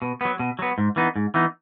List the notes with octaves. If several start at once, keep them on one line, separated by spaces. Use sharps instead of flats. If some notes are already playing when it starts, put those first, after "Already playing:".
B2
F#3 B3
B2
F#3 B3
G#2
E3 B3 D#4
G#2
E3 B3 D#4